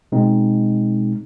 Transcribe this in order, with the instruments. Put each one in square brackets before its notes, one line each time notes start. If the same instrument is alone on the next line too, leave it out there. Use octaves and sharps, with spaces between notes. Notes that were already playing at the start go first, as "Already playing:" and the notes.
[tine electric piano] B2 G#3 C4 D#4